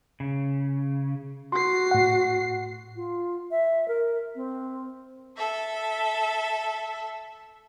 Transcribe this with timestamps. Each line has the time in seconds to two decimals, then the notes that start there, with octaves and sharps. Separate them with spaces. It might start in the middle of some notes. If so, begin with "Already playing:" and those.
0.20 C#3
1.52 F#4 C6 C7
1.91 A2 F#5
2.96 F4
3.51 E5
3.88 A#4
4.35 C4
5.37 A4 E5